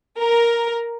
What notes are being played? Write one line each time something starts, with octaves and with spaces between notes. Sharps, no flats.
A#4